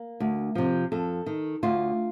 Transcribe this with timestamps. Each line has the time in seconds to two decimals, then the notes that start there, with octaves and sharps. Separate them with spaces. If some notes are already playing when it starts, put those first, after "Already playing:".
Already playing: A#3
0.20 D2
0.55 C3 F3
0.92 F2 A4
1.26 D#3
1.63 D2 F4